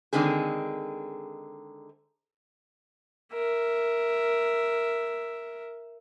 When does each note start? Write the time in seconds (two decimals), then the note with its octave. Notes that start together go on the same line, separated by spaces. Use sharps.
0.13 D3 D#3 G#3 C4 G#4
3.33 A#4 E5